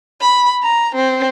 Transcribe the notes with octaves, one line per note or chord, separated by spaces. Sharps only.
B5
A#5
C4